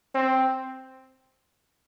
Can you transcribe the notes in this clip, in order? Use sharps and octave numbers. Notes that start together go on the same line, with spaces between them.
C4